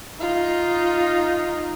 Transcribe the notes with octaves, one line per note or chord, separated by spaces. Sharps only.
D#4 F4